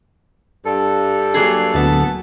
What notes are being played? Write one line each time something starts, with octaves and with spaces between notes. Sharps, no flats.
G2 A4
F#3 A#3 G#4
D1 B3 A5